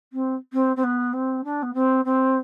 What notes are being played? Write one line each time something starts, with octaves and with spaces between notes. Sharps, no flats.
C4
C4
C4
B3
C4
D4
B3
C4
C4